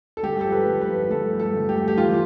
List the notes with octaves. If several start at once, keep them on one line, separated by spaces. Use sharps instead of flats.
A4
G2 G4
F3 A4
B4
G2
B4
F3
G2 A4
A3
A4
G2
G4
A3
G4
E3 F4